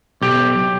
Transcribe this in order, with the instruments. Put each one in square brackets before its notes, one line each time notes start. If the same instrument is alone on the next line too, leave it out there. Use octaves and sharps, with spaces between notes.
[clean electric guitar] B1 G4